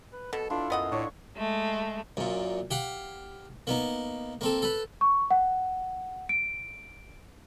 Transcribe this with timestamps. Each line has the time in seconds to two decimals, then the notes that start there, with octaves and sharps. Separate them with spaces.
0.12 B4
0.33 B2 A4
0.50 D4 E4 F4 A4
0.70 F#2 B3 D#5 F#5
0.91 A2 D4 C#5 C#6
1.36 G#3 A3
2.17 F#2 A#2
2.71 G4 F5 F#5
3.67 A#3 B3 D#4
4.41 A#3 C4 A4
4.62 A4 B4
5.01 C#6
5.31 F#5
6.29 D7